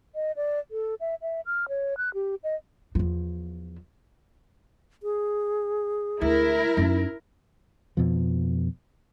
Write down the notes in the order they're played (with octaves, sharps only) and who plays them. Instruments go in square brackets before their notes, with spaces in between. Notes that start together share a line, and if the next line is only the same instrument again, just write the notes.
[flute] D#5
D5
A4
E5
E5
F6
C#5
F#6
G4
D#5
[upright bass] E2 F3
[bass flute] G#4
[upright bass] D2 [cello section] E4 A#4
[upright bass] F#2 D#4
[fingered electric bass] F2 B2 F3